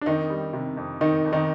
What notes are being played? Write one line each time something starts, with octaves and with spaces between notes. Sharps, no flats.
D4
F2 D#3 D#4
G3
C3
F2
F2 D#3 D#4
F2
D#3 D#4